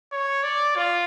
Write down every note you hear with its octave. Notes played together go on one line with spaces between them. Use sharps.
C#5
D5
F4